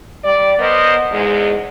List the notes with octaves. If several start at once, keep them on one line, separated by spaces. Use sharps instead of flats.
G3 D5
B3 A#4 C5 D#5
E2 G#2 G#3